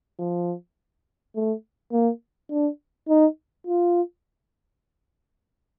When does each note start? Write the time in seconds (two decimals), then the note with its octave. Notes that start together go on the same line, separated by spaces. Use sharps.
0.19 F3
1.36 A3
1.92 A#3
2.51 D4
3.09 D#4
3.67 F4